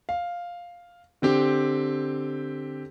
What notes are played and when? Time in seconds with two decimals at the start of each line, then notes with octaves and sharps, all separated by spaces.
0.09 F5
1.22 D3 C4 G4